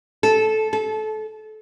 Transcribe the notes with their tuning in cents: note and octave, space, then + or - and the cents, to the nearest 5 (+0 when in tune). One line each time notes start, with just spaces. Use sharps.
A4 -15
A4 -25